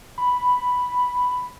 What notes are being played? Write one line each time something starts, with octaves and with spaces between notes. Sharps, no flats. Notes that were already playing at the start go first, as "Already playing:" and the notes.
B5